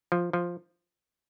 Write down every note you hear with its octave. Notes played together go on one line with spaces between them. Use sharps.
F3
F3